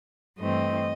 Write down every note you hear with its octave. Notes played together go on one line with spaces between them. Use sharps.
G2 E3 A3 C4 D#5